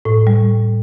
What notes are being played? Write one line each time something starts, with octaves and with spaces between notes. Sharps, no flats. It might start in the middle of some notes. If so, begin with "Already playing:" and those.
A2
G3